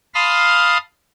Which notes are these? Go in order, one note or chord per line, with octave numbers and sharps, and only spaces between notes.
F5 A5 B5 C6 D#6 F6